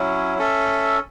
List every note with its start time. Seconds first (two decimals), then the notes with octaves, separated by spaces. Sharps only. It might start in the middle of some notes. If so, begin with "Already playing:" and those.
Already playing: F#3 C#4 E4
0.38 C#4 A4 E5